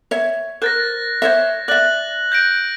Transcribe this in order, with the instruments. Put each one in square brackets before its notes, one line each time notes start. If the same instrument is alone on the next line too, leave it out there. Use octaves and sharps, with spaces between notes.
[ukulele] C#5 E5
[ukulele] A#4 C5 [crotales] F#6 A6 A#6
[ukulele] C5 C#5 E5
[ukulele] D5 E5 [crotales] F#6 F#7
[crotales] G6 A#6 D7